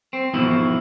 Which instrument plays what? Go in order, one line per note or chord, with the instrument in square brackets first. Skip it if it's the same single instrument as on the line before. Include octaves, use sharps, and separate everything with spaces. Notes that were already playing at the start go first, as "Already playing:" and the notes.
[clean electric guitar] C4
E2 G#2 B2 F3 E4